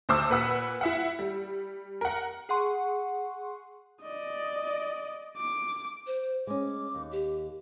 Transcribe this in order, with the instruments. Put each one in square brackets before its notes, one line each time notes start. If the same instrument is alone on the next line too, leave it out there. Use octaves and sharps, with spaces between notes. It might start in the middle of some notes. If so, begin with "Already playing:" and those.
[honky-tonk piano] D2 C5 D6 E6
A#2 B4 F#5 E6
E4 E5 F#5
G3
A#4 F#5
[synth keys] G#4 F#5 C6 C#6
[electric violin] D5 D#5
D6
[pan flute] C5
[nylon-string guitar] G#3 C#4 [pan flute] D6
[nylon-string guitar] D#2
[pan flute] G4